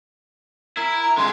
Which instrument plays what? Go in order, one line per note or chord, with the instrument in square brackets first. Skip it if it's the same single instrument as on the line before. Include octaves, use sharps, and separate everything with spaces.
[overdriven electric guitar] E4 [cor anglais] A#4
[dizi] A#5
[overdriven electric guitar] D3 G#3 [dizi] C6